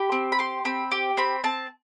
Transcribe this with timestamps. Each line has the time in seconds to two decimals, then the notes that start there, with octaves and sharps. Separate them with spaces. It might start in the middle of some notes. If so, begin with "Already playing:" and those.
Already playing: G4 B5
0.12 C4
0.32 B5
0.39 G4 C6
0.65 C4 B5
0.91 G4
1.17 C4 B5
1.44 C4 A5